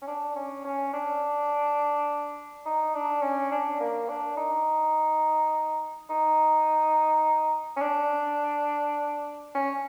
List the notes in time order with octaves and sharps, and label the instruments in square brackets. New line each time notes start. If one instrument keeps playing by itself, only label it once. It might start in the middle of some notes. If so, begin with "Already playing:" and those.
[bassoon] C#4
D4
C#4
C#4
D4
D#4
D4
C#4
D4
A#3
D4
D#4
D#4
C#4
D4
C#4